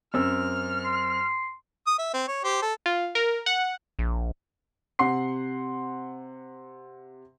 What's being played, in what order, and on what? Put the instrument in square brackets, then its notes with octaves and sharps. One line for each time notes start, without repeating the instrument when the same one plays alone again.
[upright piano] F#2 C4 E6 [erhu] F6
[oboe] C6
[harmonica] D#6
E5
C4
C#5
G4 C5
A4
[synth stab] F4
A#4
F#5
[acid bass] A#1
[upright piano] C3 F#5 C6 C7